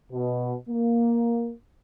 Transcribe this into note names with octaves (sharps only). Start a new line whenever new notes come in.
B2
A#3